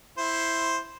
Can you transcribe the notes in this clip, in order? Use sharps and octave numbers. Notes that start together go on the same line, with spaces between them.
E4 C5